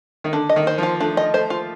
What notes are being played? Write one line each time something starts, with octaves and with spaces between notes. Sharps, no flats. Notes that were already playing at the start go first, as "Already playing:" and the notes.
D#3
D3 D4
D#5
D#3
C5
F3 F4
A3 D4
D#5
A3 C5
F4